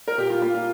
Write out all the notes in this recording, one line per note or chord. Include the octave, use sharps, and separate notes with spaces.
A#4
A#2 G4
F4
A#3 F4
F4